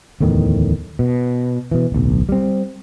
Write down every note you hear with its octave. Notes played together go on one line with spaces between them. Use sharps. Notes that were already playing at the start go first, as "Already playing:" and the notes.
D1 E2 A2 D#3
B2
B2 E3
D1 B1
G3 C4